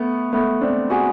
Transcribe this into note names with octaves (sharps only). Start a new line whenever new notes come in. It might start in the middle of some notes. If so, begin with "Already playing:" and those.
Already playing: A3 B3
A3 B3
C4 D4
F#4 G#4